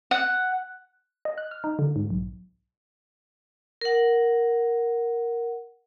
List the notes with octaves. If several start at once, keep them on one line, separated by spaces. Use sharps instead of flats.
F#5
D#5
F#6
F6
D#4
D3
G#2
B1
A#4 F#5